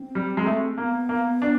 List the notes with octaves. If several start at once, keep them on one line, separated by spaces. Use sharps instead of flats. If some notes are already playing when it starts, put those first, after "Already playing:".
Already playing: C4
G3
G#3
A3
A#3 B3
A#3
D4